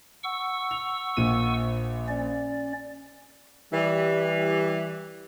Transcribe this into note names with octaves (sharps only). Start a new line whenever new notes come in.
F#5 C#6 E6
F7
A#1 A#2 D#7
C#4 D5
E3 G3